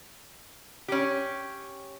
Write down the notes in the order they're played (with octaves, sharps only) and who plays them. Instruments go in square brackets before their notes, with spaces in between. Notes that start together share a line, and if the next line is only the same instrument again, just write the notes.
[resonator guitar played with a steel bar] C#4 G4